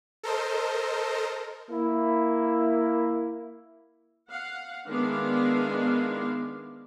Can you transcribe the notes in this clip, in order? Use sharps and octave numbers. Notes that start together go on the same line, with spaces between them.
A4 A#4 C5 D#5
A#3 E4
F5 F#5
D#3 G#3 B3 D4 E4 F5